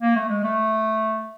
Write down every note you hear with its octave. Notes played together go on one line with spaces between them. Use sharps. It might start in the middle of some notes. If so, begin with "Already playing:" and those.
A#3
A3
G#3
A3